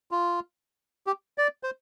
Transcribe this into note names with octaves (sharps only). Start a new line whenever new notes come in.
F4
G4
D5
C5